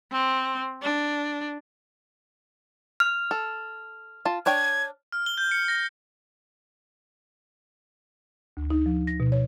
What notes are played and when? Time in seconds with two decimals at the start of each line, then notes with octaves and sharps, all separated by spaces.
0.12 C4
0.82 D4
3.00 F6
3.31 A4
4.25 F4 A5
4.46 D4 C#5 G5 G#6
5.12 F6
5.26 G7
5.38 G6
5.51 C#7
5.68 A#6
8.57 D2
8.70 D#4
8.86 F3
9.07 A#6
9.20 B2
9.32 C#5